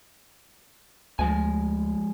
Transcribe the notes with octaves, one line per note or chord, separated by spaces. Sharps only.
D2 F3 G#3 G#5